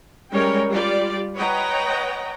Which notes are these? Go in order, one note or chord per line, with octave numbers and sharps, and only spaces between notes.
G3 G#3 C#4 A#4 C#5 G5
G3 F4 G4 D5
B4 C#5 D#5 F#5 G5 A#5